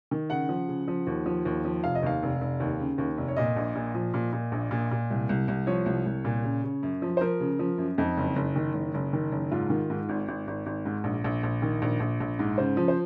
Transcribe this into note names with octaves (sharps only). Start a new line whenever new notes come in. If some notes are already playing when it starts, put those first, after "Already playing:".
D#3
C#3 F#5
F3
C#3
F3
D#2
F3
D#2
F3
F1 F5
D#5
D#2 F5
F1
F1
D#2
C#3
D#2
F1
C#5
A#2 D#5
A#1
A#2
F3
A#2
A#2
A#1
A#2
A#2
C2
C2
C2
F3 C#5
C2
C2
A#2
C#3
C#3
F#2
F3
C5
F3 A#4
C#3
F3
F#2
F2 D#4
F#1
F#1
D#3
F#1
F#1
D#3
F#1
G#2 F4
D#3
G#2
G#1
G#1
G#1
G#1
G#2
A#1
A#1
A#1
D#3
A#1
A#1
A#1
G#2
C#3 C5
F3
C5